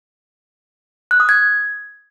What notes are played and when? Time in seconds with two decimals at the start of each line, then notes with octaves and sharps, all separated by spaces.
1.11 F#6
1.20 D#6
1.29 G#6